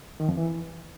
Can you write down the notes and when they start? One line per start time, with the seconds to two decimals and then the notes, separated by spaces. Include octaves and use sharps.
0.20 D#3
0.29 F2
0.37 E3